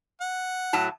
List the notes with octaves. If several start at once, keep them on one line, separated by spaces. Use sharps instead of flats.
F#5
A2 F#3 A5